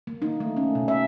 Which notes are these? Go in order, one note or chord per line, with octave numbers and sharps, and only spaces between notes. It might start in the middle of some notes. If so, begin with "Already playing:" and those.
A#3
D#4
A3
C#4
B2
E5